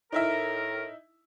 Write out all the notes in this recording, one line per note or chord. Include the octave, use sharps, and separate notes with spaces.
A2 D#4 E4 A#4 E5